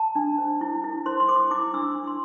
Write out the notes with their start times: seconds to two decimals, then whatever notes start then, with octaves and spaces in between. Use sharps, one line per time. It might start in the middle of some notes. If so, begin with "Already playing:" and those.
Already playing: A5
0.15 D4
0.38 C5
0.61 E4
0.84 E4
1.06 C5 C6
1.20 C6
1.29 C5 D6
1.51 E4 D6
1.74 D4 E6
1.96 D4
2.07 C6